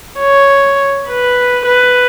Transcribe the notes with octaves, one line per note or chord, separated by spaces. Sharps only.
C#5
B4
B4